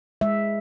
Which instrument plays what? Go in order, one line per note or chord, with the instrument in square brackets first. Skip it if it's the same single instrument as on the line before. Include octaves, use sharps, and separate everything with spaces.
[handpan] G#3 E5